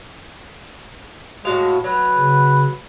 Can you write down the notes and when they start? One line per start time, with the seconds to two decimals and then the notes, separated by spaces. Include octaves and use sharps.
1.45 A2 G#3 F#4 F5
1.84 F#3 B4
2.16 C#3